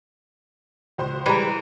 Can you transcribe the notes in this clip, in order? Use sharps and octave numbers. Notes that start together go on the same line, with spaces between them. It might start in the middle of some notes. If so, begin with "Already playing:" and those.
C#2 C5 C6
E3 G3 G#3 A#5 E7